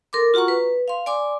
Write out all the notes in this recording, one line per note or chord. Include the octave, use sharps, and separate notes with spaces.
A4 A#4 C6 D6
F4 F#4 F#5 A#5 C#6
B4
F5 C6
D5 G#5 C6 D6